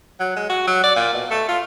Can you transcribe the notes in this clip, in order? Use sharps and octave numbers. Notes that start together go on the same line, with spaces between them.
F#3
G#3
F#4
F#3
D5
A#2
B2
A3
F4